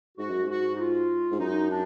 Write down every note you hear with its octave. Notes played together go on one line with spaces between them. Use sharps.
G#2 F#4
F#2
G#2
F#4
D#4
F4
G#2
F#2 D#4
D4